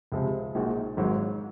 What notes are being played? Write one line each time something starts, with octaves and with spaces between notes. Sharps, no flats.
C#2 C3 F3 G#3
A#1 A#2 G#3 D#4 F#4
G#1 G#2 F#3